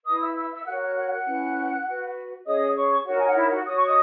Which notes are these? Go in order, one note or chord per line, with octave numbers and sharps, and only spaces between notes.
E4 B4 D#5 D#6
E5 E6
E5 E6
E5 E6
F#4 A#4 C#5 F#5 F#6
F#5 F#6
F#5 F#6
F#5 F#6
C#4 E4 B4
F#4 B4
C#4 G#4 C#5 D#5 D#6
C#5 C#6
D#4 F#4 A#4 C#5 F#5
G#5
F#5
E4 E5
F#4 F#5
F#4 C#5 D#6
C#6
D#5 D#6